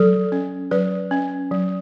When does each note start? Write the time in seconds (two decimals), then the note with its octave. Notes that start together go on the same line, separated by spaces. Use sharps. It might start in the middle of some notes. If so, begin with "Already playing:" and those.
Already playing: F#3 A4
0.32 C#4
0.71 F#3 B4
1.11 C#4
1.51 F#3